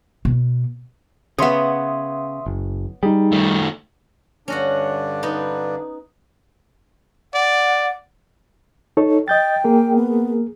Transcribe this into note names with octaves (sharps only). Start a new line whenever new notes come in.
B2
C#3 B3 C#5 E5 C6 D#6
F#1
G3 D#4 G#4
D#3 A3
G2 D3 C#4 D4 F#4 F#5
B3 D#4
D5 F#5
D#4 A4 C#5
D#5 G5 G6 A6
A#3 G#4 A#4
B3